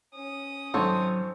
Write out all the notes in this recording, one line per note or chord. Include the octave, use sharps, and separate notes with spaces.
C#4 D#6
G#1 F#3 C4 A4 C#5